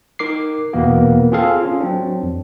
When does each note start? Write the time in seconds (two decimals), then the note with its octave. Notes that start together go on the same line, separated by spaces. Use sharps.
0.19 D#4 A#4 D6 C7
0.73 E2 B2 E3 A#3 B3
1.32 C4 F4 G#4 A4 F5
1.61 C#4 F4
1.80 F#3 C4 D4
2.23 F2